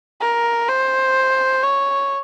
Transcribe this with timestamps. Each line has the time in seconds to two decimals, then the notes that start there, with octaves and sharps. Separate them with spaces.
0.21 A#4
0.69 C5
1.64 C#5